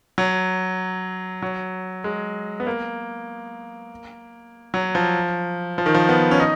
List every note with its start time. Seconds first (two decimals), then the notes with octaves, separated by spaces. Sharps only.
0.18 F#3
1.42 F#3
2.04 G#3
2.60 B3
2.67 A#3
4.74 F#3
4.95 F3
5.78 F3
5.86 D#3
5.95 F3
6.09 B3
6.31 C#4
6.40 D#4